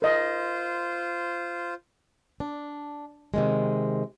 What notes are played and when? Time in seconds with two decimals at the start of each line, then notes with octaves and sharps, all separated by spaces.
0.02 F4 A#4 C5 D#5
2.40 D4
3.34 C3 D#3 G#3